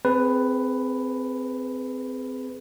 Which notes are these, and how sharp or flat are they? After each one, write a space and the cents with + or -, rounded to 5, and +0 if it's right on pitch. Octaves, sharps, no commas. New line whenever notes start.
C4 -20 G#4 +10 B4 +10